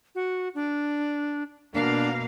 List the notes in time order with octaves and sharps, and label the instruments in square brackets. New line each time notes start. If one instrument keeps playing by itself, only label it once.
[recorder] F#4
D4
[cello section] B2 A#3 F5 [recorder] D4